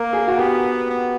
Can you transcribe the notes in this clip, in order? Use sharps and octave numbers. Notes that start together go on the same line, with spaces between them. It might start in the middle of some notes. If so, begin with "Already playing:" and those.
Already playing: A#3 A#4
G#4
F#4
B3 G4
B3